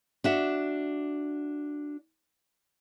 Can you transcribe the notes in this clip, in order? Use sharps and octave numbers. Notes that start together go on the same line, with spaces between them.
D4 F#4 E5